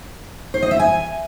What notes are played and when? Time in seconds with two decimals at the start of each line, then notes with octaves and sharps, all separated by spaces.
0.54 C5
0.62 D#5
0.71 E5
0.79 G#5